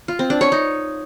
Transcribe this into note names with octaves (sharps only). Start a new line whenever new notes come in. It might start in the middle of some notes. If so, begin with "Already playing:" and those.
F4
C4
D4
C#5
D#4